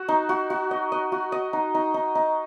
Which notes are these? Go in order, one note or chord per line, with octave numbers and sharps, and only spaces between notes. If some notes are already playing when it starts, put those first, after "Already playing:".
Already playing: F#4
D#4
F#4
F#4
D#5
D#5
F#4
D#5
D#4
D#4
D#4
D#4